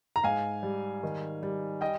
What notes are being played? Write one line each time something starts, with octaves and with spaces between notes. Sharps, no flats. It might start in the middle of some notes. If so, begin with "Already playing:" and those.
A#5
G#2 F5 G#5
G3
D#3
G3
D#5 G5